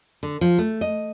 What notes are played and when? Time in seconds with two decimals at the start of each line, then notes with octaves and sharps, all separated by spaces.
0.23 D3
0.41 F3
0.58 A3
0.81 D#5